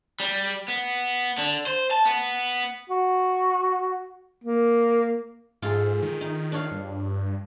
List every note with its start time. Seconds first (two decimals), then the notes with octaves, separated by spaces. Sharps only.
0.20 G3
0.68 B3
1.38 D3
1.67 C5
1.91 A5
2.06 B3
2.90 F#4
4.44 A#3
5.62 G#2 F4 G#4 A4
6.02 D#3
6.21 D#4
6.52 D4 C#5 F5
6.71 G2